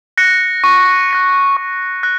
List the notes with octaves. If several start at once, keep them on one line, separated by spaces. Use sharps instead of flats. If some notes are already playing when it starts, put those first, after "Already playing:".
F#6 A#6 C#7
C#6
F#6 A#6 C#7
C#6
F#6 A#6